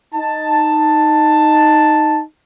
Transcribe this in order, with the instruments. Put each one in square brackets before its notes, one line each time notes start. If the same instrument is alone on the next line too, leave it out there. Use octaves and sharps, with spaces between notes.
[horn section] D#4 A5